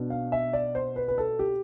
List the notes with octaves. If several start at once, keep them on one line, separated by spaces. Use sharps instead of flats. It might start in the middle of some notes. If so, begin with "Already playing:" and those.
Already playing: B2 B3 D4
F5
E5
D5
C5
B4
B4
A4
G4